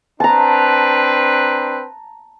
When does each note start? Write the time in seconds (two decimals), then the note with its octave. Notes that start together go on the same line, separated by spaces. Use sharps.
0.20 C4 D4 B4 A5 A#5